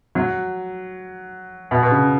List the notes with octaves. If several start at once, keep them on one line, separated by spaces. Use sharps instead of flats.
F#3
B2
B2
C#3